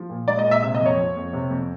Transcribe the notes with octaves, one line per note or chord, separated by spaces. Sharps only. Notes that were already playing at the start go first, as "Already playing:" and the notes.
Already playing: F3
A#2
G#3 D5
D#5
A#2
E5
C3 E5
D#5
F2
C#5
F3
F2
C3
F2